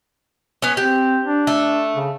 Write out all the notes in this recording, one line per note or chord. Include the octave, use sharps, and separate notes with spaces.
B3 C#4
C4 G4
D4
A3
C#3